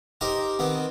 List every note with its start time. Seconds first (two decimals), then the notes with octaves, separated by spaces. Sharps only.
0.21 D#4 G4 A#4 C5
0.59 D#3 B3 C4